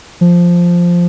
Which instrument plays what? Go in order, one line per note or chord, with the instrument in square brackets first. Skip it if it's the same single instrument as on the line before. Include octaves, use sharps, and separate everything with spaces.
[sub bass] F3